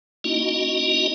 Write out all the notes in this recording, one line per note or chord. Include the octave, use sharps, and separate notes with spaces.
A#3 C#4 D#4 E4 F#4 D#5